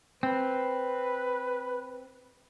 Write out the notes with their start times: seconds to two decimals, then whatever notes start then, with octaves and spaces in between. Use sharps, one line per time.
0.23 C4 B4